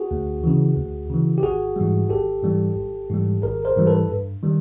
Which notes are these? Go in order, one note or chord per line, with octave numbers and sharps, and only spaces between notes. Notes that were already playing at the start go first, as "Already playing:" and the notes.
Already playing: F#4 G#4
D2
C#3 E3
D2
C#3 E3
G4
G#1 F#4 G#4
G#2 E3 G3
G#1 G4 A4
G#2 E3 G3
G#1
G#2 E3 G3
G#1 G#4 A#4
A#4 C5
G#2 E3 G3
A4 B4
G2
D#3 G3